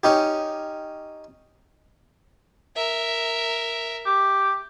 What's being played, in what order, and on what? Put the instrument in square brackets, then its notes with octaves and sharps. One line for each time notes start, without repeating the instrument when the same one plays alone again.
[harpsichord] C#4 D#4 G4
[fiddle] A#4 E5
[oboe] G4